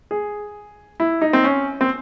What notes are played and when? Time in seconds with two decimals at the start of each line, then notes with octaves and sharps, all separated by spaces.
0.11 G#4
1.00 E4
1.21 D#4
1.33 C4
1.44 C#4
1.81 C4